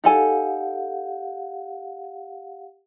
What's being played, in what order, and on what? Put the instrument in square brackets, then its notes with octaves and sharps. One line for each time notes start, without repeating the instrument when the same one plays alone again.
[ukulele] D#4 A4 G#5 [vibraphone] G4 F5 F#5